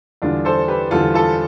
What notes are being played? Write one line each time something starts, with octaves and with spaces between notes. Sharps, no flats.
E2 D3 G3 D4 F4
A4 C5
G4 B4
E2 D3 G3 F4 A4
F4 A4